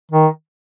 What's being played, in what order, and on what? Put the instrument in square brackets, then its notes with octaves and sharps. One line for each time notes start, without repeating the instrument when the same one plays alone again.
[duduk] D#3